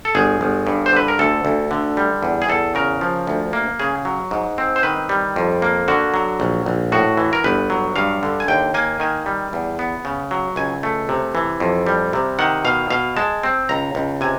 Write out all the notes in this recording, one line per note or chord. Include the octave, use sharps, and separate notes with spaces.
A4
G1 G#4
G1
G2
C5
D3 B4
A#4
D2 A4
D2
D3
G3
E2
G#4
E2 A4
C#3 A#4
F3
D2
A#3
C#3 G#4
F#3
G#2
C4
C5
D#3 B4
G3
F2
A#3
D3 F#4
F#3
A#1
A#1
A2 F#4
E3
A#4
G1 B4
F#3
G2 F5
D3
G#5
D#2 G5
A#3 G#5
D#3 G#5
G3
E2
B3
C#3
F#3
C#2 G#5
A3
C3
E3
F2
G3
C3
D#3 F#5
B2 F5
B2 F5
G#3 A5
C4
C#2 A#5
C#2
C3 G#5